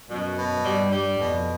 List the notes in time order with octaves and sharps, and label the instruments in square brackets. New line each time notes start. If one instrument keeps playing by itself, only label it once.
[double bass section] F#2 [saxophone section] B2
[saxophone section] B2
[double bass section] G2 [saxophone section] G3
[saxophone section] G3
[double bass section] F2 [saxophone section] B2